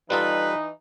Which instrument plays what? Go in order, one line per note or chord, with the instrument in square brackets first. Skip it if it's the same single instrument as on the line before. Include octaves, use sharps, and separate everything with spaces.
[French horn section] E3 D#4 [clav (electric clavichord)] G3 F4 A4 [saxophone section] B4